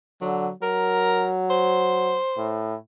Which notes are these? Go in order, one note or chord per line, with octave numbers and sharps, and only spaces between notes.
D3 F#3
F#3 A#4
C5
A2